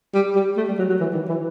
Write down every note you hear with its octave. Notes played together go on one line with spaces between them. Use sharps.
G3
G3
A3
G3
F#3
F#3
E3
D#3
E3